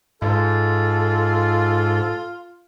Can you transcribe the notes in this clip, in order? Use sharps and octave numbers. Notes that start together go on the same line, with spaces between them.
G#2 F4 A4